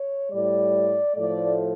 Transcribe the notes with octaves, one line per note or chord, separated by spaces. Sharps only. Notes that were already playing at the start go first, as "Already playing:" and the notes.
Already playing: C#5
A2 G3 D5
A2 F3 A3 D5